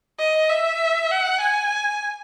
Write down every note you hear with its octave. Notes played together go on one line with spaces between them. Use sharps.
D#5
E5
F#5
G#5